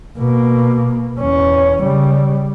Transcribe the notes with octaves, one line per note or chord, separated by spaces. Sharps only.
B2 A#3
E2 C#4
C#3 G3